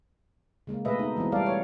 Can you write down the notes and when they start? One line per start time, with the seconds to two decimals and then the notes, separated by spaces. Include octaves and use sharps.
0.67 C#3 G#3 A#3
0.85 B2 A3 G#4 B4 D#5 E5
0.99 D#4
1.17 E3 G#3 B3 C4
1.32 G3 A4 D5 F5
1.46 C#5